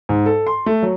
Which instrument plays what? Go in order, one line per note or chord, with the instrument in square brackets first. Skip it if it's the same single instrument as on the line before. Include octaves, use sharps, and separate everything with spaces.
[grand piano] G#2
A4
C6
A3
F#3